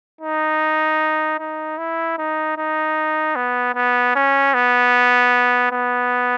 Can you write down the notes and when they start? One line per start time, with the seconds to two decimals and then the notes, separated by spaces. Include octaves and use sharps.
0.21 D#4
1.39 D#4
1.78 E4
2.18 D#4
2.57 D#4
3.36 B3
3.75 B3
4.15 C#4
4.54 B3
5.72 B3